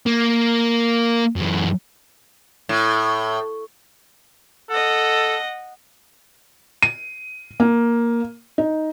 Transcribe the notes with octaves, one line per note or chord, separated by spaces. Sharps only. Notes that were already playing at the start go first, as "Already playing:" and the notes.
A#3
F#2 E3
A2
A4 D#5 F#5
D#7
A#3
D#4